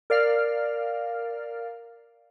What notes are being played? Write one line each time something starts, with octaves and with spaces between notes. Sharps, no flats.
A#4 D5 F5 F6